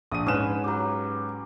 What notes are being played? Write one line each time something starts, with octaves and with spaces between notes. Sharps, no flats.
A#1 D#6 D#7
G#2 C#4 B4 B5 D#6 E7
F#3 G4